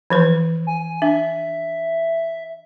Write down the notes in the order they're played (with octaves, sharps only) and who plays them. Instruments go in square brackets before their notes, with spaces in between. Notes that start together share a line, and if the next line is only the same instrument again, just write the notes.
[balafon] E3 F3 B4
[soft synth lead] G#5
[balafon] D4 [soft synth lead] E5